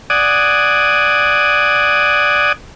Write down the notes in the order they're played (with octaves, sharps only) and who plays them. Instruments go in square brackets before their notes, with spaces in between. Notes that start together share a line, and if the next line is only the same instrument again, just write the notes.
[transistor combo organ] D5 F#5 G#5 D#6